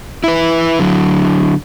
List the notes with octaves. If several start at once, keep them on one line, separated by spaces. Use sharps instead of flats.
E4 B4
D3 F#3